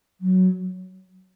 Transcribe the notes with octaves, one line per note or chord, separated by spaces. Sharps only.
F#3